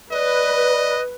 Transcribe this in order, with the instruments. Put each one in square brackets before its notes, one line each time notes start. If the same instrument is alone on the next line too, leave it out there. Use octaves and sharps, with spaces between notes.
[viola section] B4 [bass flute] D5 [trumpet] D#5